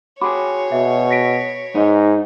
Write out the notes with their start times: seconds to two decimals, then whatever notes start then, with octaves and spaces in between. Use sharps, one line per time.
0.21 F#4 G#4 C#5 B5 C6 D6
0.72 B2 E5
1.11 A#6 B6 D7
1.75 G#2 D#4